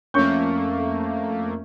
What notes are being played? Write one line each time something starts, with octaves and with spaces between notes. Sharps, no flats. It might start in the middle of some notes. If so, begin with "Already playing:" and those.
F2 A3 A#3 C#4 C#6 G6